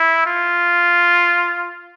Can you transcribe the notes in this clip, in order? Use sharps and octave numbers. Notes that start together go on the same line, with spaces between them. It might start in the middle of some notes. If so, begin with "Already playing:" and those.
Already playing: E4
F4